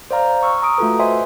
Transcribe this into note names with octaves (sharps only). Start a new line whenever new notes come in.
C5 D5 F5 A#5 F6
C#6 E6 F6
A#5 D#6 D7
A3 F4 F#4 A4 B4
B4 C5 D#5 E5 G#5 C6